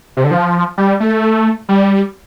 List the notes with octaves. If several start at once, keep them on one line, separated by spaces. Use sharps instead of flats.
C3
D3
F3
G3
A3
G3